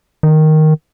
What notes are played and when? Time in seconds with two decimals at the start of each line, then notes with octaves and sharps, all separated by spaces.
0.23 D#3